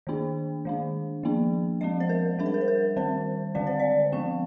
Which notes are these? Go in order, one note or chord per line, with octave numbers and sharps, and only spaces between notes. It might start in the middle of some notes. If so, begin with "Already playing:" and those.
D#3 A#3 D4
D#3 G#3 D4
F3 A#3 D4
F3 G#3 C4 D#5
C5
A#4
G3 D4 A#4
C5
A#4
C5
A#4
D#3 G3 C4 C5
D3 G#3 C4 D5
C5
D5
F3 G#3 C4 G5